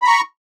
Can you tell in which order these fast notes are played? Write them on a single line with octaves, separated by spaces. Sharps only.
B5 A#5 C#6